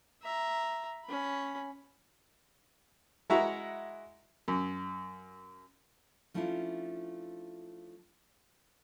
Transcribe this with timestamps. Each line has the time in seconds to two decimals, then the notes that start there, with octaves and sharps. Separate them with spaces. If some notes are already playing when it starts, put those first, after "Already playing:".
0.23 E5 A#5
1.05 C#4 B5
3.30 G#3 E4 F#4 E5 F#5 A#5
4.48 F#2
6.34 F3 A3 C#4 D4 E4 F4